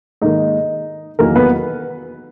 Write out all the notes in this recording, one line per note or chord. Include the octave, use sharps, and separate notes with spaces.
G#2 D#3 A#3 D#4 D#5
E2 D#3 F#3 A#3 A#4
B3 B4